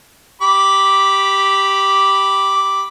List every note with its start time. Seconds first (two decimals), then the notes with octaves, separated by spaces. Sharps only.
0.42 G4 B5 D6